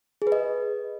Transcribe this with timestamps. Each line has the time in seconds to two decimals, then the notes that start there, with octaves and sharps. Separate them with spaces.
0.22 G#4
0.27 B4
0.32 D#5